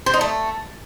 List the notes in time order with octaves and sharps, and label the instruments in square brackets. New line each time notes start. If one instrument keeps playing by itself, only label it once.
[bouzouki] C5
D#4
A3